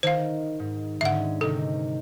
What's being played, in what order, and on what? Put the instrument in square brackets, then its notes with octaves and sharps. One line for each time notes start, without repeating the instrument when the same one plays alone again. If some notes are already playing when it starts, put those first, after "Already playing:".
[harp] D#3 [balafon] C5 F5
[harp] G#2
[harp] G#2 D3 C#4 [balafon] E5 F#5
[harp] C3 D#3 [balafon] A4